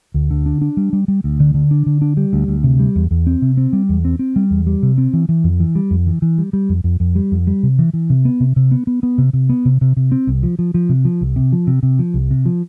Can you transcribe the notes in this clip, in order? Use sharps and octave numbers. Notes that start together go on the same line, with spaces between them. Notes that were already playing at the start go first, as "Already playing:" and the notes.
D2
D3
D4
D4
G3
G3
G3
D2
D3
D3
D4
D3
D4
G3
D2
D2
C3
G3
E2
E2
C4
C3
C4
G3
E2
C4
C4
G3
E2
G3
C3
C4
E3
E3
F2
E3
G3
F2
E3
E3
G3
G3
F2
F2
F2
G3
F2
G3
C3
E3
E3
C3
B3
C3
C3
B3
B3
B3
C3
C3
B3
C3
C3
C3
C4
C2
F3
F3
F3
C3
F3
C2
C3
F3
C3
C3
F3
C2
C3
F3